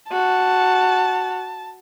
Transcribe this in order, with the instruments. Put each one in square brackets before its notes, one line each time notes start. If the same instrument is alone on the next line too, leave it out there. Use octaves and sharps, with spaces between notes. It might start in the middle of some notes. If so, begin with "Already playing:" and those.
[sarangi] F#4 [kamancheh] A5